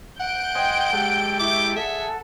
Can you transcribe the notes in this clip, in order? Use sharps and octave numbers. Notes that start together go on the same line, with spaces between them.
F#5 G6 D7
C5 D#5 G5 G#5
G#3 G4 A4
E4 E5 D6
G#4 A4 E5 F#5 A5